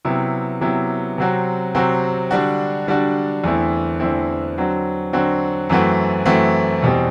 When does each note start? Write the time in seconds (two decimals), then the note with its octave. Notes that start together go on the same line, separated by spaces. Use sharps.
0.05 C3 F#3 B3 E4 G4
0.61 C3 F#3 B3 E4 G4
1.18 C3 F#3 C4 F#4
1.75 C3 F#3 C4 F#4
2.31 D3 G3 D4 F#4
2.87 D3 G3 D4 F#4
3.44 E2 D3 A3 C4 E4
4.00 E2 D3 A3 C4 E4
4.57 D3 F#3 C4 F#4
5.13 D3 F#3 C4 F#4
5.69 F#2 E3 A3 C4 F#4
6.26 F#2 E3 A3 C4 F#4
6.82 E2 B2 G3 C4